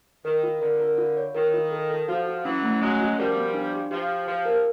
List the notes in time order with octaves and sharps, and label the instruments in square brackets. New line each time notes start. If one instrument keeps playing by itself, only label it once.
[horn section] D#3 [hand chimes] A#4
[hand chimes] F4
[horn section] D3 [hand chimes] A#4
[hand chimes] A#4
F4
C#5
[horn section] D#3 [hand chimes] A#4
[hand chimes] F4
A4
A4
[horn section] F3 [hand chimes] F#4
[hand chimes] F#4
[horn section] E3 F#3 [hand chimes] C#4
[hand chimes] A3
[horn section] F#3 G#3 [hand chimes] C#4
[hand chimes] F#4
[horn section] F3 G3 [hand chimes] A#4
[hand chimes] B3
D4
G4
[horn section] F3 [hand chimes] G4
[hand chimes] G4
[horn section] F3 [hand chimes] G4
[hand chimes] A#4